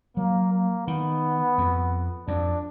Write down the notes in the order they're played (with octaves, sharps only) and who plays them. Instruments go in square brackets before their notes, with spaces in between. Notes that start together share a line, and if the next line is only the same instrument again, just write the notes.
[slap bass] F#3 [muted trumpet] A#3
[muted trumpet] A#3
[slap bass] D#3 [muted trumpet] B3
[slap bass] F2
[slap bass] F2 [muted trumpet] D4